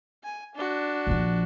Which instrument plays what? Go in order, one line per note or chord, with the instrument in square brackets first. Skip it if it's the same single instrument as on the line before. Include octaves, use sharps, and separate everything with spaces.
[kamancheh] G#5
D4 F#4
[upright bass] A#1 F3